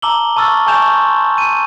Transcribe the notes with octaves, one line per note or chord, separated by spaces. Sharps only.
A5 A#5 D6 E6 F#7 G7
A5 C#6 E6 F6 A6
G#5 A5 C#6 G6 E7 F7
C6
D#7